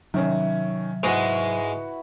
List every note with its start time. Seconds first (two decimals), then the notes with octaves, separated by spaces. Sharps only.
0.14 C3 D#3 F#3 C#4 E5
1.03 G#2 G#3 E4 F#4 B4 F#5 C#6